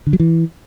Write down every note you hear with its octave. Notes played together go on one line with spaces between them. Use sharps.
D3
F#3
E3